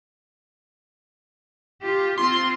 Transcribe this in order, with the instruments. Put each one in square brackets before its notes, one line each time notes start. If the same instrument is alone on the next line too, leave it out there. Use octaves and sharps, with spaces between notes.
[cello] F4 G4
[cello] C4 F4 [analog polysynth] C6